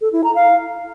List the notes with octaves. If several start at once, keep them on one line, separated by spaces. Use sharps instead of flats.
A4
E4
A#5
F5